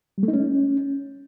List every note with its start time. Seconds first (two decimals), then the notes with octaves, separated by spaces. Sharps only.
0.18 G3
0.23 A3
0.28 D#4
0.33 C#4